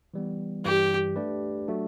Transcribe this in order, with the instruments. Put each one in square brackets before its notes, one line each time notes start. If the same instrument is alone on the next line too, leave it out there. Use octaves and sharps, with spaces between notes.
[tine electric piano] E3 G3 B3
[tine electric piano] G2 E3 G3 [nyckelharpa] G4
[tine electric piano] A3 D4 G4 B4 D5
F#3 A3 D4 F#4